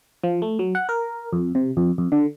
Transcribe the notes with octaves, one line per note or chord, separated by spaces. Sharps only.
F3
A3
F#3
F#5
A#4
F2
C3
F2
F2
D3